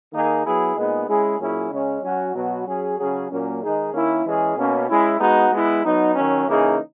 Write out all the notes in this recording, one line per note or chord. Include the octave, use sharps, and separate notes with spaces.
D#3 A#3 D#4 G#4
F#3 B3 E4 G#4
A#2 G#3 B3 D#4 G#4
G#3 C#4 E4 G#4
A#2 F#3 C#4 E4 G#4
C#3 G#3 C#4
F#3 C#4 F#4
B2 F#3 B3 F#4
F#3 C#4 G#4
C#3 F#3 C#4 G#4
A#2 F#3 A#3 C#4
D#3 G#3 D#4 G#4
D#3 A#3 C#4 E4
E3 G#3 C#4 G#4
B2 A#3 C#4
G#3 C#4 E4
G#3 B3 D#4 F#4
G#3 B3 E4
F#3 B3 D#4
D#3 F#3 C#4
C#3 E3 A#3 D#4 G#4